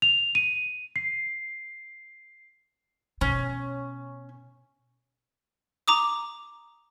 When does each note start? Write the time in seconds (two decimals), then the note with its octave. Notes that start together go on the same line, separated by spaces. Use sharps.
0.02 F7
0.35 D#7
0.96 C7
3.21 B2 C#4
5.88 A#5 D6 D#6